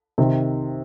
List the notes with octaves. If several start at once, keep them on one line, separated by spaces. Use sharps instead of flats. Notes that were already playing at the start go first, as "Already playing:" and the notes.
C3 D#3